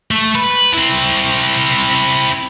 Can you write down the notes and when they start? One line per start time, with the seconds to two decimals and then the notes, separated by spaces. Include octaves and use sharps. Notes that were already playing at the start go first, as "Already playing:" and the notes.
0.11 A3
0.35 B4
0.74 C4 E4